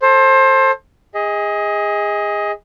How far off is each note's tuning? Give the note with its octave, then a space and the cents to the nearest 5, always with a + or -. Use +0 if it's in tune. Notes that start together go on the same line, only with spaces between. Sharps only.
A4 +0 C5 +25
G#4 -25 D#5 +20